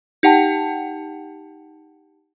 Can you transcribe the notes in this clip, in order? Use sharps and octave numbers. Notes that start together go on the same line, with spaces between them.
D#4 G4 F#5 G5 A5